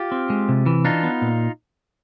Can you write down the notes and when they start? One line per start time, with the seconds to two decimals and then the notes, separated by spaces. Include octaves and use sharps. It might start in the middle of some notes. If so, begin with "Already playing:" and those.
Already playing: F4 G4
0.12 C4
0.30 G#3
0.49 C3
0.66 E3
0.85 D4 D#4 F4
1.03 B3
1.22 A#2